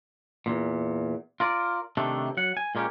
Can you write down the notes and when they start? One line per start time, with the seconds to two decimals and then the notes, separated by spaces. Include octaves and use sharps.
0.46 E2 G2 A#2
1.40 F4 A#4 D5
1.97 C3 D#3 A3 D4
2.37 F#3 F#5
2.57 G#5
2.75 A#2 G#3 A#3 C#4 G4